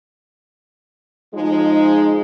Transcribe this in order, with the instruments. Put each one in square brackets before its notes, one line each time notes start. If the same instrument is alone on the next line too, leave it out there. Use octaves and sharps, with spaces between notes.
[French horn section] F3 G#3 D#4